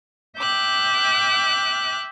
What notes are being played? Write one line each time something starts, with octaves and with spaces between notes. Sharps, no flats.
E5 G5 D6 F#6